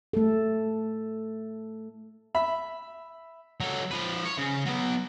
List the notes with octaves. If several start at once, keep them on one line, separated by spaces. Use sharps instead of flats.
A3 A4
E5 B5
F#3 A4
F3 B4
C#5
C#3
F#3 B3